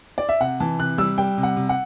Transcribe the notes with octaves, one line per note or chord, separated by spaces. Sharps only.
D5
E5
C3 F#5
E3 A5
C3 F#6
G3 E6
G3 G5
C3
F#5
C3
F#5